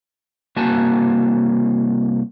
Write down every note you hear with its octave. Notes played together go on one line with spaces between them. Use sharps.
C2 A#3 F#4 G#5 A5